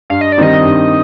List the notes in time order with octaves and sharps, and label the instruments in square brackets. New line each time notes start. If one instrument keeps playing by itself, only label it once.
[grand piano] G2 [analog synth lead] F5
[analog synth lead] D#5
D5
[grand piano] D#3 G3 C4 D#4 [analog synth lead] D#5
[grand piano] G2